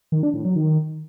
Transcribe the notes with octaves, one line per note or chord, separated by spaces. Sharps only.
D#3
D4
A2
F#3
D#3